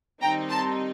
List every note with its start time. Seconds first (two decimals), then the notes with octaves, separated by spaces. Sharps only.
0.21 D#3 G3 C4 D#4 G5 A#5
0.50 A5 C6